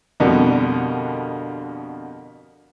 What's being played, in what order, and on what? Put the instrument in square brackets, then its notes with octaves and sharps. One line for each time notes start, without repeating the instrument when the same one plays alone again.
[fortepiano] F2 B2 D3 G3 A#3